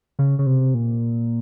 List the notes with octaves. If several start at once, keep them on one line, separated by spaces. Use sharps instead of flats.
C#3
C#3
C3
A#2